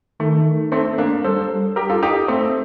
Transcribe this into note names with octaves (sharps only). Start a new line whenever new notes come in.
D#3 A3
A3 C4
A#3 D4
G3 A4 C5
G4 A#4
F4 A4
D#4 G4
A3 C4